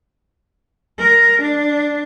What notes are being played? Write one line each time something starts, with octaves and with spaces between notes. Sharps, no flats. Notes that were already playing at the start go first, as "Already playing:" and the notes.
A#4
D4